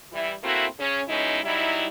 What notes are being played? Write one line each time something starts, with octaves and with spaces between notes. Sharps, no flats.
E3 G3 E4
A3 A#3 C4 E4 F#4
C#3 C#4
B2 G#3 C#4 D#4 E4
F#3 G3 D#4 E4